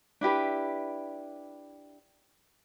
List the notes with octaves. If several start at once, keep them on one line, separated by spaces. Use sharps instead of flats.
D4 E4 G4 B4